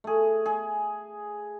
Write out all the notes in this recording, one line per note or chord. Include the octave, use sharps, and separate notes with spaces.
A3 G#4
G#4